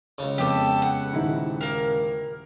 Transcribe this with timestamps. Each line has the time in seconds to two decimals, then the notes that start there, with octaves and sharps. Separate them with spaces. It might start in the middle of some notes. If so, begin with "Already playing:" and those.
0.18 C#2 C#3
0.38 F2 B3 G4 A4 D6
0.82 F#5
1.13 D#1 D#4 E4
1.61 A#3 A#4